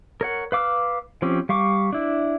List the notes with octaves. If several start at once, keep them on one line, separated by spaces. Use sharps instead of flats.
A#4 C#5 F#5
B4 F5 D6 E6 F6
F3 C4 C#4 G4
G3 F5 C#6 D6
D4 E4